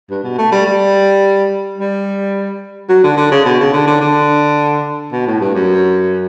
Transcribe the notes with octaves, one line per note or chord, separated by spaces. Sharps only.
G2
B2
A3
G3
G3
G3
F#3
D3
D3
C#3
B2
C#3
D3
D3
D3
B2
A2
G2
F#2